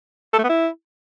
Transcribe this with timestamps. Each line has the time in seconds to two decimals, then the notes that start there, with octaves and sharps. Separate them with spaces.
0.33 A4
0.39 A3
0.44 B3
0.49 E4